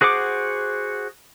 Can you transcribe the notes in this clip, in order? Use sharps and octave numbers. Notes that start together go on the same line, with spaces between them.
F#4 G#4 C5 F#5 D6